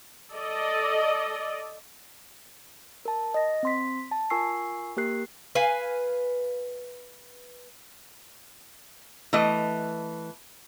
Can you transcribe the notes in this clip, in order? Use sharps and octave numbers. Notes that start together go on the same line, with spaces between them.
A4 D5 D#5
A#4 A5
D#5 A#6
C4 C6 B6
A5
F4 A#4 G#5 C#6 E6 C7
A#3 G4 A#4 F#6 C7
B4 F5 G#5
E3 A3 D#5